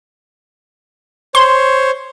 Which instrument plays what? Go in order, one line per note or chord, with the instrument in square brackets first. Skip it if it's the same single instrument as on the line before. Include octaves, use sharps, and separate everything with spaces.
[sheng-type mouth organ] C5 C#5 [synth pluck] C6